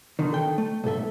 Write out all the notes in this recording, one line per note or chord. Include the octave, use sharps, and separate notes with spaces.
B2 D3 D#3
A4 G5
A3
B1 G#2 A4 E5